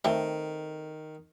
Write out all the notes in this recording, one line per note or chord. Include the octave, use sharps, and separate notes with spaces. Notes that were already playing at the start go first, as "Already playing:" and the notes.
D#3 A3 C4 C5